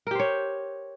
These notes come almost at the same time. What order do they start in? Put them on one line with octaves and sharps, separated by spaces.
A#4 G4 C5 C#5